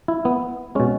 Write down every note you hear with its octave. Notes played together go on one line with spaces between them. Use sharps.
E4
B3
B2 G#3 C#4